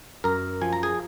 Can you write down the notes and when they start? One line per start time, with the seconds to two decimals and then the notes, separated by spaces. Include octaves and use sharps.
0.24 F#2 A#4 A#5
0.61 F3 G#5
0.73 A#5
0.83 G#4 G#5